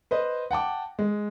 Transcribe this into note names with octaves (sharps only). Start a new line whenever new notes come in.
B4 C5 D#5
F#5 G5 A5 D6
G#3